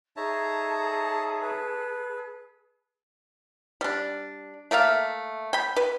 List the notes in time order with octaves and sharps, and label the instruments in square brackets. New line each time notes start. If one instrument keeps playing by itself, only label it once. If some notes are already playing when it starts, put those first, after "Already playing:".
[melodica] D#4 C#5 E5 [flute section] G#4 A4 [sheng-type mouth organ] A5 A#5
[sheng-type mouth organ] B4
[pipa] G3 D4
A3 A#3 E5 F5
G5 B5
B4